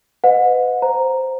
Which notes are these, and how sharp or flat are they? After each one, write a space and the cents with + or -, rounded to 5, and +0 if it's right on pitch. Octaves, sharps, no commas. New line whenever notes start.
B4 +30 D#5 +5 F#5 -35
C5 +0 A#5 +0